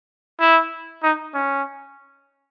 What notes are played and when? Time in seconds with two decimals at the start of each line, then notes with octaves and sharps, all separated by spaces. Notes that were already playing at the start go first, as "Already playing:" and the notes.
0.40 E4
1.03 D#4
1.34 C#4